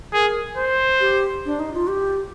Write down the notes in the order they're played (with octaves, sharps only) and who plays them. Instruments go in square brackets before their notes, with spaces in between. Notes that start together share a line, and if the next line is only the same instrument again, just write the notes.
[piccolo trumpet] G#4 [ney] A#4
[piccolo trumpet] C5
[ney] G4
D4
D#4
F4
G4